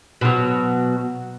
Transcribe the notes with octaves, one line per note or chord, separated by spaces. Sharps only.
B2 F#3